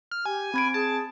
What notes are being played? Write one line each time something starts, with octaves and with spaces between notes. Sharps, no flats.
F6
G4 G#5
C4 B5 G#6 D7
G#4 A5